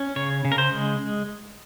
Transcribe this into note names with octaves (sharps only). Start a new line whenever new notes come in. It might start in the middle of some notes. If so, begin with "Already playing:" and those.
Already playing: C#4
C#3 C#5
C#3
A#4
C5
G#3